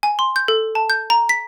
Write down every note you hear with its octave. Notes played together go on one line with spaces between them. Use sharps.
G#5
C6
G6
A4
A5
G6
A#5
B6